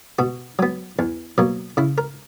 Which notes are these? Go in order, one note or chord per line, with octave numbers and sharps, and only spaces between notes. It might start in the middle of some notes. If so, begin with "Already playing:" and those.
B2 F#4
F#3 B3
E2
B2 F#3 A#3
C#3 E4
A#4